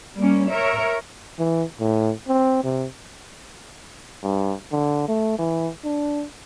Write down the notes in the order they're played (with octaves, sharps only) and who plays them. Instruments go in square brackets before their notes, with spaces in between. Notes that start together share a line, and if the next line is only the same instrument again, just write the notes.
[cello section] G3 A#3 C#4
A#4 C#5 E5
[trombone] E3
A2
C4
C3
[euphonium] G2
D3
A3
E3
D4